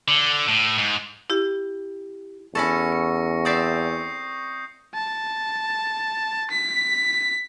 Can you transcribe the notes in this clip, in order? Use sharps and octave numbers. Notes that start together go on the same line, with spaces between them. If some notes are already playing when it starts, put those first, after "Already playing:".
D3
A2
G#2
E4 G4
E2 C#4 E4 A4 C#6 A#6 C#7
C#7
C4 D5 E5 D#6 G6 C7
A5
B6